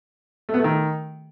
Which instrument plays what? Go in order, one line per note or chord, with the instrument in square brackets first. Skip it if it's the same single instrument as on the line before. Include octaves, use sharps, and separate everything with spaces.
[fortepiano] A3
B3
A3
D#3